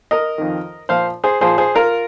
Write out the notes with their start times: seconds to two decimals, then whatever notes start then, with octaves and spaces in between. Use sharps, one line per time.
0.11 A#4 D#5
0.38 F2 D#3
0.89 A#2 F3 C5 F5
1.24 G#4 C5
1.41 A#2 F3 G#4 C5
1.58 G#4 C5
1.75 F4 A#4